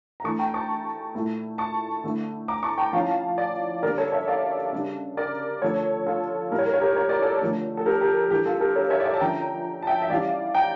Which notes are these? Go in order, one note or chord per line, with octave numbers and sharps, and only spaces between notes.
A#5
E3 A3 D4 A5 C#6
G5 A#5
A5 C#6
A#2 A3 E4
A5 C#6
D3 A3 E4
A#5 D6
A5 C#6
G5 A#5
F3 C#4 E4 F5 A5
D5 F5
D3 G3 A#3 A#4 D5
A4 C#5
C#5 E5
D5 F5
C#3 G3 D4
A#4 D5
D3 F3 A3 A4 C#5
F4 A4
A#2 G3 A#3 E4 A#4
C#5
A#4
C#5
G4 A#4
C#5
D5
A4 C#5
D3 F3 A3
A4
G4 A#4
G4
E3 G3 D4 G4
F4 A4
G4 A#4
A4 C#5
C#5 E5
D5
C#5 E5
A5
D3 F3 C#4 G5 A#5
A5
E5 G5
E5
E3 G3 C#4 E4 D5 F5
G5 A#5